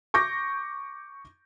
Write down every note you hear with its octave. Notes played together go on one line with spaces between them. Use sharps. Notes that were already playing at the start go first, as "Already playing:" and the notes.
C#6 D6 G6 A#6